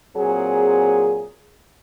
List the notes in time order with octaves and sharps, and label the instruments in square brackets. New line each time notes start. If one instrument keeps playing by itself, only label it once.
[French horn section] A#2 F#3 C4 G#4